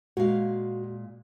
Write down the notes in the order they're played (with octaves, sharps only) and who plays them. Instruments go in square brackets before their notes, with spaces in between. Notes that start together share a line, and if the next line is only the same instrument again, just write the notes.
[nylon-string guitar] A#2 G#3 F5 [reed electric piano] F#4